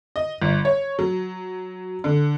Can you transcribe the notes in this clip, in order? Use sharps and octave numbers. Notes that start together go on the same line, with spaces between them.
D#5
G1
C#5
F#3
D3